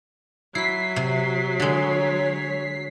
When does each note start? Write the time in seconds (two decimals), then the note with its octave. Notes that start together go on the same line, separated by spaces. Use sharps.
0.55 F#3 E4 B6 C7
0.96 C3
1.60 D3 G#3 C#5